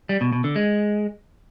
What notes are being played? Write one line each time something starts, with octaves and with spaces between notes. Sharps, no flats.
G3
B2
B2
D3
G#3